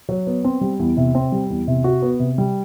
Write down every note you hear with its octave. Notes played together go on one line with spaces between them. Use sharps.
F#3
B3
C4
G3
E2
C3
C4
G3
E2
C3
F#4
B3
C3
G3